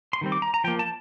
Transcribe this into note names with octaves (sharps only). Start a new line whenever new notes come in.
C6
D#3 G3 C4
D6
A#5
A#5
F3 A#3 G5
A5